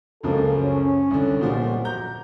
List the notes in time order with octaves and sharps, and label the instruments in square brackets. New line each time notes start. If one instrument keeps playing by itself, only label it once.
[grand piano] C#2 F#2 F3 [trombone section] A#3 F#4 A4
[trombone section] C#4
[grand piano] C2 D3
[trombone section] B1 F#2 F#4 [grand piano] A#2 F3 G3
[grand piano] A#5 G6